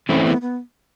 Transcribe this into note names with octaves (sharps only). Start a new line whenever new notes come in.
E3 A3 C4 C#4 E4
B3
B3